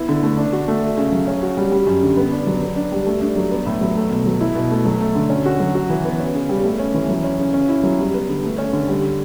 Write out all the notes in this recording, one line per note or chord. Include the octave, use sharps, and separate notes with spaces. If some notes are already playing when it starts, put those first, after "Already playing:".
Already playing: B3 E4
D3
A3
D4
F#4
A3
A3
C#3
F#3
C#4
F#4
G3
G3
F#2
D3
B3
D4
F#3
B3
D4
G3
A3
D4
F#3
B3
A2
F#3
A3
B2
F#3
E4
B2
A3
F#3
A3
D3
C#4
F#4
F#3
F#4
E3
B3
C#4
C#3
G3
A3
C#4
E3
F#3
C#4
C#3
C#4
E4
F#3
G3
B3
D3
A3
C#4
D3
G3